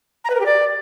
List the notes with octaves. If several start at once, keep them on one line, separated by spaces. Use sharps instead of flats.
A#5
B4
A#4
G4
D5